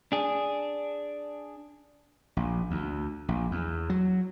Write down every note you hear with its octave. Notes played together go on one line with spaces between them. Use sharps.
D4 G#4
A#1
D2
A#1
E2
F#3